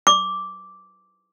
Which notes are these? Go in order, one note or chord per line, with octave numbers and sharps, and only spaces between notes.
D6